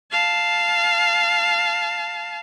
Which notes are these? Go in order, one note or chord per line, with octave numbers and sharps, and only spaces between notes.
F5 A5